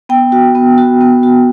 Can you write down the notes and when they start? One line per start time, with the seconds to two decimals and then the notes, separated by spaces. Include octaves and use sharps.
0.09 B3 G5
0.32 F#4
0.55 B3
0.78 F#4
1.01 B3
1.23 F#4